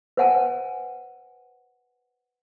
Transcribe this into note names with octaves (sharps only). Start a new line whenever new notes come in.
B4 C5 F#5 G#5 A5